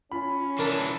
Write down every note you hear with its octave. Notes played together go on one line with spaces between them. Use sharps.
C#4 F4 B5
E3 D4 A#4 A5